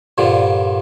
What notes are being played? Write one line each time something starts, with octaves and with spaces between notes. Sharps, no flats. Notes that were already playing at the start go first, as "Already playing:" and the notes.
G2 A#2 D3 F3